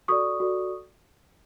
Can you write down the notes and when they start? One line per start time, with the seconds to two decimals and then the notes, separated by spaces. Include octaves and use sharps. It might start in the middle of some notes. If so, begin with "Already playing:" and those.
0.08 F#4 A4 D5 C#6 D#6
0.40 F#4 A4 D5